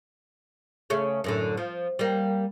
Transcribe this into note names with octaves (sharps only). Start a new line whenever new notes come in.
C#3 A3 C#4
F#2 A2 D3
F3
G3 A#3